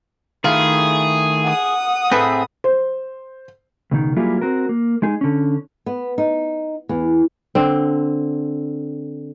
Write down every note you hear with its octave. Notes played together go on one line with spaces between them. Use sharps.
D#3 A3 E4 F4 G#4
F#5 D#6
A2 C4 G#4 A4 B4 E5
C5
C#2 B2 D#3
F#3 G3 A#3 E4 F4 G#4
C4 F#4 A#4
A#3
G#3 D#4 G#4
D3 C#4
B3
D#4
E2
D3 C4